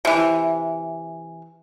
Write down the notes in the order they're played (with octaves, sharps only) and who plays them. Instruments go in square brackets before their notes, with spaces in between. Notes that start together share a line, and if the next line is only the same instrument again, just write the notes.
[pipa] C3 E3